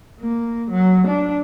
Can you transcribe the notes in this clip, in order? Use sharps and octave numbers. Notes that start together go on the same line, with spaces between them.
A#3
F#3
D4